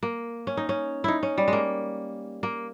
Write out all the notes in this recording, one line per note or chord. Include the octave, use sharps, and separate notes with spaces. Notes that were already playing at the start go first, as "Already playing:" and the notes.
A#3
C#4
D#4
C#4
D#4 E4
C#4
G3
G#3
A#3
A#3